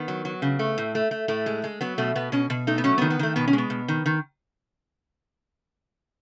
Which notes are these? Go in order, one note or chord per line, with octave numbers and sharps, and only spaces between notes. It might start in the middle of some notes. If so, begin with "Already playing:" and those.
Already playing: D#3 B3
F#3
F#3
C#3
A3
A2
A3
A3
A2 A3
G#3
G#3
F#3 B3
B2 A3
B2 B3
B2 C#4
B2
A3 D#4
B3
F#3 C#4
B3
D#3
B3
D#3 A3
B2 B3
C#4
G#3
B3
B2
D#3
D#3